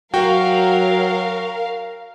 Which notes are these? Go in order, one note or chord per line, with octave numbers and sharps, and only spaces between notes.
F#3 F#4 A#4 F5 G5